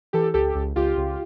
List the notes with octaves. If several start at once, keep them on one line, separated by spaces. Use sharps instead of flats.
E3 G4 A4
C#2 G4 A4
C#2
C#2 F4 G4
C#2